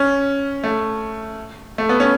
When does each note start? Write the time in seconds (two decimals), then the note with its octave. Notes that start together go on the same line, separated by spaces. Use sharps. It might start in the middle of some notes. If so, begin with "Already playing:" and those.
Already playing: C#4
0.64 A3
1.78 A3
1.89 B3
2.00 C#4